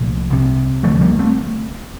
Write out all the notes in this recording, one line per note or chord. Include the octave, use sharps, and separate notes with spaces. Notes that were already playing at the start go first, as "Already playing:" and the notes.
Already playing: C2 A#2 F3 A3
C2 C3
D2 D3 F3 A3
G3 A#3
A3 C4